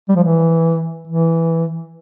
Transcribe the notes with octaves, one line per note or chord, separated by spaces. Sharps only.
G3
F3
E3
E3